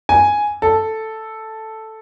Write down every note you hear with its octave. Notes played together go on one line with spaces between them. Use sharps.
G#5
A4